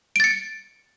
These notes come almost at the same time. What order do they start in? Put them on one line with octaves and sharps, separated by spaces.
D7 A6 C#7